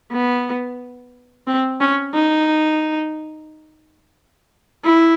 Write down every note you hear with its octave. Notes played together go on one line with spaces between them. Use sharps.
B3
C4
C#4
D#4
E4